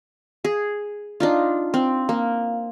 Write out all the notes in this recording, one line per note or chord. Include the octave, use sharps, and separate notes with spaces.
G#4
D4 D#4 F4
C4
A#3